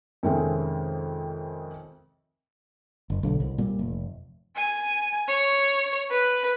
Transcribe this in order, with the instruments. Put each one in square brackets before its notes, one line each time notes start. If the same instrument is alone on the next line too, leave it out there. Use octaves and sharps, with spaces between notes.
[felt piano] F2 C3 D#3 G#3 C4 C#4
[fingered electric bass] F#1
B1 D3
C2
A#2 G3 A#3
F1
[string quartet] G#5
C#5
B4